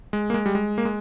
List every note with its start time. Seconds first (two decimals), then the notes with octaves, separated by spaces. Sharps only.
0.13 G#3
0.30 A#3
0.34 G#3
0.46 G3
0.55 G#3
0.78 A#3
0.85 G#3